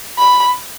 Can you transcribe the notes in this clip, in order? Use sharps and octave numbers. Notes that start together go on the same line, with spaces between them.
B5